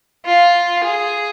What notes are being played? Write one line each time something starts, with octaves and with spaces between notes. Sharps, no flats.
F4
G#4